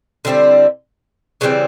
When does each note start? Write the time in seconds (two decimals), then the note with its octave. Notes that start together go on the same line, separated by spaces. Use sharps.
0.25 D3 G3 C4 E4
1.41 C#3 E3 G3 C4